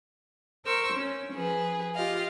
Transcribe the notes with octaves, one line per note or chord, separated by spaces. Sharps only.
A#4 C5 C#6 E6
C#4
F3 G#4 B4
F4 G4 D#5 F5